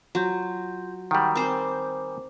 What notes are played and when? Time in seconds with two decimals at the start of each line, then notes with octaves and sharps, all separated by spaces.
0.15 F#3 F4 C6 G6
1.11 D#3 G3 F#5 G5 C#6
1.35 C4 A#4 C5 G#5 D6